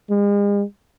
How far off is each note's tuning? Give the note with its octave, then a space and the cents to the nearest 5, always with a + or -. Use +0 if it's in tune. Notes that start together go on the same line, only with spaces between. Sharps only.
G#3 -40